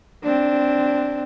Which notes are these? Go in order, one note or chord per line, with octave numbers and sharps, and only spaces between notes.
C4 D4